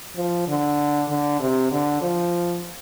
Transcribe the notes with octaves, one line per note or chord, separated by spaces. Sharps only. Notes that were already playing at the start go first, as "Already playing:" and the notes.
F3
D3
D3
C3
D3
F3